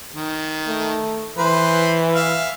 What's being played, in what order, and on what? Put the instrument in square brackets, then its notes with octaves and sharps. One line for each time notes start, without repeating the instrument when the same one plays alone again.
[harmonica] D#3
[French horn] A3
[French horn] E3 [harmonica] B4 C5
[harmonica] E5 F5